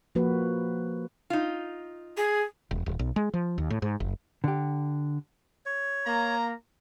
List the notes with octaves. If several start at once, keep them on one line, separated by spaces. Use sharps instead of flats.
F3 A#3 F#4 B4
D#4 F4
G#4
E1
D#1
B1
G#3
F3
D#2
A2
G#2
F#1
D3 G4
C#5
A#3 A#5